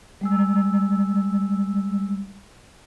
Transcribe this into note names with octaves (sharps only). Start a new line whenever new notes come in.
G3 G#3 E6